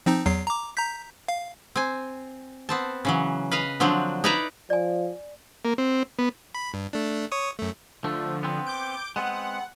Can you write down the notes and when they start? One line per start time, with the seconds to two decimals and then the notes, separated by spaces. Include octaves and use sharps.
0.06 F3 C4 D#4
0.26 E2 F#3 C7
0.47 A#5 D6
0.77 A#5 G6 B6
1.28 F5
1.76 C4 G#5
2.69 B3 C4 A5
3.05 C#3 E3 F#3
3.51 B4 D#5 F5
3.80 D3 F3 F#3 C4 D4
4.24 D#4 E4 B4 D5 E5 A#5
4.70 F3 D5 G#5
5.65 A#3
5.78 C4
6.19 B3
6.55 B5
6.74 G2
6.93 A3 D4
7.32 C#5 C#6 D#6
7.59 F#2 A3
8.04 D3 F3 A3
8.43 B3 C4
8.67 D6 G6 D7
9.16 G#3 B3 C4 F#5